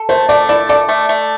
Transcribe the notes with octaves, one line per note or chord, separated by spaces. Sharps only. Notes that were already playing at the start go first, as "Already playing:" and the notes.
Already playing: A4
A3 C5
A3 D5
E4 D5
A4 D5
A3
A3